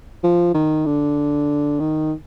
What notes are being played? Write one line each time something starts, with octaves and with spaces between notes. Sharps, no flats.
F3
D#3
D3
D#3